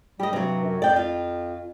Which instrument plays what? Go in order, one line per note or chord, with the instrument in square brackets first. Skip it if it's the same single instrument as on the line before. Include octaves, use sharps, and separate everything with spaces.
[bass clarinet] G3 [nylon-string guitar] G4 D#5
[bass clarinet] G2 [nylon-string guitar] C3 F#3
[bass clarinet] F#2
[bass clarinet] F2 [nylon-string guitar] D5 G5
[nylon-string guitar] F4